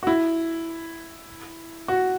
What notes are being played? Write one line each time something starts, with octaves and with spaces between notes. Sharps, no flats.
F#4
E4
F#4